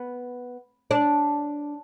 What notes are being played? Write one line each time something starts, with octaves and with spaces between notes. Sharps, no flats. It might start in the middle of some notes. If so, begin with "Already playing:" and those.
Already playing: B3
D4